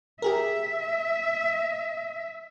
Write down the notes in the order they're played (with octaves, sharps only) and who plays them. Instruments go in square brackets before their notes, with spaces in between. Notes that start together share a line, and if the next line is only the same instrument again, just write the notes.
[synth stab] G4 G#4 A#4 [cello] E5